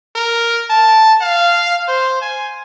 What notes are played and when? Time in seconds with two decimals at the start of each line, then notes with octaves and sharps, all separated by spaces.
0.16 A#4
0.70 A5
1.21 F5
1.88 C5
2.21 G#5